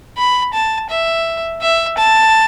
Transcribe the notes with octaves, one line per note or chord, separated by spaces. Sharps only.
B5
A5
E5
E5
A5